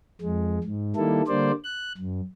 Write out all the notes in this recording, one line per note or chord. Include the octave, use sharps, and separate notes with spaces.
F2 G#3
G#2
D#3 G3 A#3 E4 A4
D3 G3 A#3 C5 D5
F#6
F#2